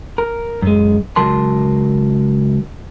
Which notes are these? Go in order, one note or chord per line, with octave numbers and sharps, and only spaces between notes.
A#4
F#2 G#3
C#2 F#3 A#4 A5 C6